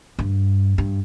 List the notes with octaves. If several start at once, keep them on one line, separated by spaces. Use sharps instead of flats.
G2
G2